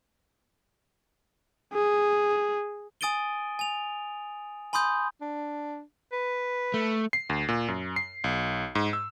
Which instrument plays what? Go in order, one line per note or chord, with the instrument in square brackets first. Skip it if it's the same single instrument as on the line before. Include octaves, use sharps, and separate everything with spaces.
[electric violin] G#4
[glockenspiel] G#5 D#6 A6 D7 D#7 G7
G#5 F7
G#5 B5 C6 D#6 G6
[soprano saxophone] D4
B4
[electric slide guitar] A3
[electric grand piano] C7
D2
A#2
F#2
C7
B1
G#2
E6